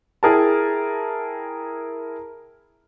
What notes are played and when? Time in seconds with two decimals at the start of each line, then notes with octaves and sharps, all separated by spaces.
0.23 E4 G#4 A#4 G5 A5